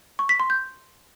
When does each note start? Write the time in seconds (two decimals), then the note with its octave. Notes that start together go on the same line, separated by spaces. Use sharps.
0.19 C#6
0.29 B6
0.40 C6
0.50 G6